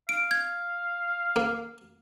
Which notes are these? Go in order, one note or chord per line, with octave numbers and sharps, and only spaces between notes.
F5 D7
G#6
A#3